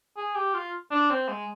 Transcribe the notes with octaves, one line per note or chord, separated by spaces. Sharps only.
G#4
G4
F4
D4
C4
G#3